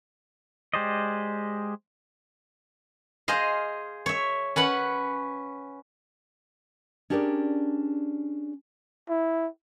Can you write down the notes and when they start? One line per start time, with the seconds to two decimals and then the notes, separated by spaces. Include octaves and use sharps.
0.74 G#3 G4 C5 D5 D#5
3.28 G#4 C5 D#5 F5
4.06 C#5 E5
4.56 C#4 B4 F#5 B5
7.10 C#4 D4 G4 G#4 A#4 D5
9.09 E4